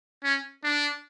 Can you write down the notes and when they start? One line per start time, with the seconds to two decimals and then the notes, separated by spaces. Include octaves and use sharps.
0.24 C#4
0.64 D4